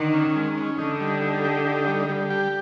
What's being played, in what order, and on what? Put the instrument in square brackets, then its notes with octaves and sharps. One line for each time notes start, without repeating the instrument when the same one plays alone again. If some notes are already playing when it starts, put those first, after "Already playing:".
Already playing: [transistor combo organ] D3 [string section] D#3
[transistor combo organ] C#4
G#3
C#4
[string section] D3 [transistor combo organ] D#4
[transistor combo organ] G3
D#4
G4
D#4
G3
G3
G4